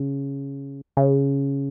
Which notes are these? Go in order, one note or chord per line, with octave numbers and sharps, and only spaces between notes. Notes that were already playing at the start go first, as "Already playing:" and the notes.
Already playing: C#3
C#3